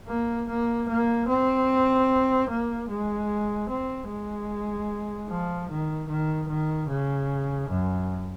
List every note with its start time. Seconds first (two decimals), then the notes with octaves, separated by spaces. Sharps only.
0.08 A#3
0.49 A#3
0.89 A#3
1.28 C4
2.49 A#3
2.89 G#3
3.70 C4
4.09 G#3
5.29 F3
5.70 D#3
6.09 D#3
6.49 D#3
6.89 C#3
7.70 F#2